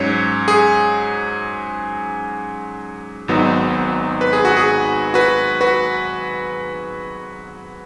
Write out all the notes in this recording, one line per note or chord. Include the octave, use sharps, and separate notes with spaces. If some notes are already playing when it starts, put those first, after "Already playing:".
Already playing: G#2 F#3 C#4 C#5
G#4
G#1 G#2 F#3 B3 D#4
B4
G#4
F#4
G#4
F#4 B4
F#4 B4